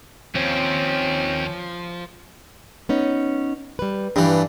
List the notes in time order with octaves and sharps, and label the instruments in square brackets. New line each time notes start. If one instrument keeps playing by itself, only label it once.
[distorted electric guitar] D#2 [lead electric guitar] F3 [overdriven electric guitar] C4 [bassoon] C#4
[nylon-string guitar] B3 C#4 D#4
G3 B4
[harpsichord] G2 E3 [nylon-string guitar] D4